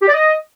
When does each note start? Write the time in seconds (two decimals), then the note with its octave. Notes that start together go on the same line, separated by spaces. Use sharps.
0.01 G4
0.07 D5
0.13 D#5